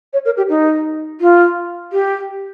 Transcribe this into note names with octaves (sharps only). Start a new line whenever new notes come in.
C#5
A#4
G4
D#4
F4
G4